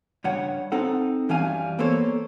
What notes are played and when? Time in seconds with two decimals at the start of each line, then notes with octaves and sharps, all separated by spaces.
0.24 G2 C#3 C#5 F#5
0.72 C4 D#4 A4 F#5
1.29 F#2 E3 G3 C#4 F5 G#5
1.79 A#3 B3 A4 C5 C#5